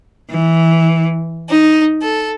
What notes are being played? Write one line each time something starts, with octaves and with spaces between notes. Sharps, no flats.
E3
D#4
A4